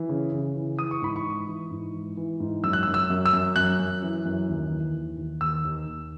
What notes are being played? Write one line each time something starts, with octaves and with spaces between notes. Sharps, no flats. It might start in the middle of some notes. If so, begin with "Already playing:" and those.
Already playing: E3
C#3
C#3
E3
E3 D#6
C#6
G#2 B5
C#6
E3
E3
G#2
E3
E3
G#2
F#2 E6
F#6
E6
F#2
E6
F#2
E6
F#2
F#2 F#6
F#2
E3
F#2
D#2
E3
D#2
D#2
D#2 E6
D#2
D#2